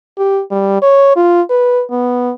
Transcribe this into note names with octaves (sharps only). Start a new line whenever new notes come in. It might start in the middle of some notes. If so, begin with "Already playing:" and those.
G4
G3
C#5
F4
B4
B3